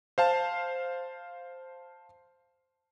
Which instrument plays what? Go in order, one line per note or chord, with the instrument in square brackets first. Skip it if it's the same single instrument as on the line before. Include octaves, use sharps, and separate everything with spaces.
[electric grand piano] C5 F5 A5